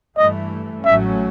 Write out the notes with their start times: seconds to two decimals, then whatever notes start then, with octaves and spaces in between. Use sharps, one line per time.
0.18 G2 E3 A3 D#5
0.85 A1 A2 F#3 A3 C#4 E5